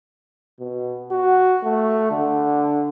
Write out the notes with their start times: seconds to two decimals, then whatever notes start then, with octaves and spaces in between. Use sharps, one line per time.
0.60 B2
1.11 F#4
1.64 A3
2.11 D3